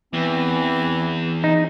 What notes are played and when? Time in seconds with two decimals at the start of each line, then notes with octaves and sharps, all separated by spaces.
0.13 E2 E3 C4 B4
1.44 D#4